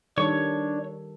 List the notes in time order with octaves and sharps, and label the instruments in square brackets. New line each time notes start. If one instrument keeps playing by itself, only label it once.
[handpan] D#3 G3 A4 [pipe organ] D4 [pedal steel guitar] C#5 C#6